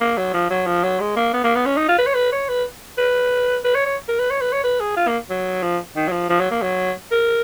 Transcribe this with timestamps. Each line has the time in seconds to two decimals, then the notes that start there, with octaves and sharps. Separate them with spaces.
0.01 A#3
0.17 F#3
0.34 F3
0.50 F#3
0.67 F3
0.84 F#3
1.00 G#3
1.16 A#3
1.33 B3
1.44 A#3
1.55 B3
1.66 C#4
1.77 D#4
1.88 F4
1.99 B4
2.07 C#5
2.14 B4
2.32 C#5
2.49 B4
2.98 B4
3.64 B4
3.75 C#5
3.86 C#5
4.08 A#4
4.19 B4
4.31 C#5
4.41 B4
4.52 C#5
4.64 B4
4.80 G#4
4.97 F4
5.08 A#3
5.30 F#3
5.63 F3
5.96 D#3
6.08 F#3
6.12 F3
6.29 F3
6.40 F#3
6.51 A#3
6.62 F#3
7.12 A#4